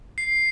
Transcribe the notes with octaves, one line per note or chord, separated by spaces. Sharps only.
C7